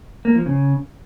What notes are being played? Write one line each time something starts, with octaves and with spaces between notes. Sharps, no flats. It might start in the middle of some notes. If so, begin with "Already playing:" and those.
A#3
F3
C#3